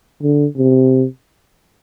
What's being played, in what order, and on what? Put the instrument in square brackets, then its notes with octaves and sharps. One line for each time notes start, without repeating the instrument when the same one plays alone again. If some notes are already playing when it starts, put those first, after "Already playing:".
[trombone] D3
C3